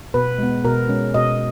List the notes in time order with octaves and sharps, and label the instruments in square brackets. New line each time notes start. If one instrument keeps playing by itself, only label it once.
[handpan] B2 B4
G#3 B3
B2 A#4
G#3 C#4
B2 D#5